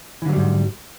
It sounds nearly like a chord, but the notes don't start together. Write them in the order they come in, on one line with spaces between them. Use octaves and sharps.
E3 D3 F#3 G3 G#2